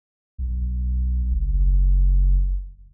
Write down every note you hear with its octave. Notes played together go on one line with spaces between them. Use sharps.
B1
F#1